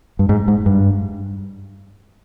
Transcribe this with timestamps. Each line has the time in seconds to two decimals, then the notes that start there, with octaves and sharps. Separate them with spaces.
0.19 G2
0.29 G#2
0.48 G#2
0.66 G2